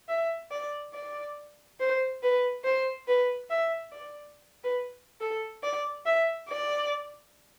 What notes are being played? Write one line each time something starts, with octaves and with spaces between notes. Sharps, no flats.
E5
D5
D5
C5
B4
C5
B4
E5
D5
B4
A4
D5
E5
D5